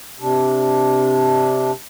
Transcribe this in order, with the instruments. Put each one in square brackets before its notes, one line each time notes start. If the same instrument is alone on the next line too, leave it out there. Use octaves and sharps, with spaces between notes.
[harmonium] C3 D4